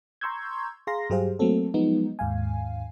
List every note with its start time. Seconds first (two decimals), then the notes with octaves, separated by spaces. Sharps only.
0.21 A#5 C6 C#6 E6 G6 G#6
0.87 G#4 F5 A#5 C6 A#6
1.10 G2 F#3 G4 G#4 C5 F5
1.39 F#3 A3 A#3 C4 A4
1.74 F3 F#3 G#3 B3 D#4
2.19 D#2 G#2 F5 G#5